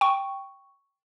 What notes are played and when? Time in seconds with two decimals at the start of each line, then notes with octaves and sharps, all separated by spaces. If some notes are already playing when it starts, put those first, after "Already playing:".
0.01 G5 C#6